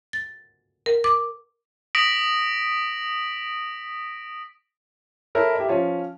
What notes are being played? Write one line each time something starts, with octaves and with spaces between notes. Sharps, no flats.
A6
A#4
D6
D#6 A#6 B6 D7 F#7
E4 A4 A#4 C#5
G4 E5
F3 C#4 F4